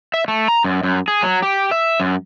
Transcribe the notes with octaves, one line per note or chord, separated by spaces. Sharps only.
E5
A3
A#5
F#2
F#2
G#4
F#3
G4
E5
F#2